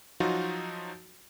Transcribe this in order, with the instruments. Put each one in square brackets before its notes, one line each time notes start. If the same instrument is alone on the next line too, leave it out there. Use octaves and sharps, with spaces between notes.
[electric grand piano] F3 F#3 D#4 F4 F#4